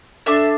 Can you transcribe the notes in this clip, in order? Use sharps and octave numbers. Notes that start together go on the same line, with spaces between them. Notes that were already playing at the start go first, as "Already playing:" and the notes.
D4 A4 E5